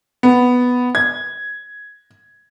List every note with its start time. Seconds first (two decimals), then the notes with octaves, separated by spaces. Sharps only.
0.23 B3
0.95 G#6